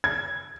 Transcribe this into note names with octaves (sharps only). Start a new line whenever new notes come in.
G#6